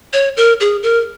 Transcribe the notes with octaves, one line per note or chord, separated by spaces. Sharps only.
C#5
A#4
G#4
A#4